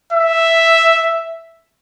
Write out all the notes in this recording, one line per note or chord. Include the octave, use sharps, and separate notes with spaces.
E5